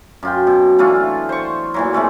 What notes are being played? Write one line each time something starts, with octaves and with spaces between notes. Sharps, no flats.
F#2 F4 G5
B2
E3 A3 D4 F4
C5 C#6
A#2 E3 F#3
C3 G#3 A3 D5